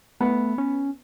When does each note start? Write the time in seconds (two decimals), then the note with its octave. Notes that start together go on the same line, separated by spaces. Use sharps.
0.20 A3 B3
0.58 C#4